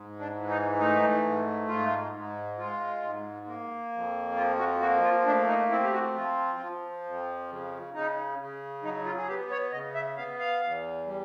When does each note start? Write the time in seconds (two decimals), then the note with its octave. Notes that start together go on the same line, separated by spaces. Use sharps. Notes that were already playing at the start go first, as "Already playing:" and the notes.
Already playing: G#2
0.19 D4
0.35 E3
0.49 D#4
0.79 A3 D#4
1.23 G#2
1.67 G#2 F4
2.12 G#2
2.58 G#3 F4
3.03 G#2
3.46 A#3
3.92 F2
4.36 F3 F4
4.58 F#4
4.81 A#3 F#4
5.03 F4
5.26 A3 D4
5.48 D#4
5.70 C4 E4
5.83 G4
5.93 F#4
6.14 F3 F4
6.59 F3
7.05 F2
7.49 C#3
7.94 C#3 D#4
8.39 C#3
8.83 F#3 D#4
9.05 F4
9.17 G#4
9.28 B3 G4
9.51 C#5
9.72 C#3 D#5
9.94 E5
10.17 B3 F5
10.39 F5
10.61 E2
11.06 G3